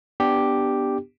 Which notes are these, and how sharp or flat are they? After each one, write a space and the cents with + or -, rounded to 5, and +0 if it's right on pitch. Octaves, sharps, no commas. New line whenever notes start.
B3 +0 D4 +0 G4 +0